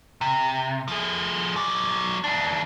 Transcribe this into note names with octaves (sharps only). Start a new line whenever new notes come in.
C3
F3 G#4
F#3 D5
D#2 D4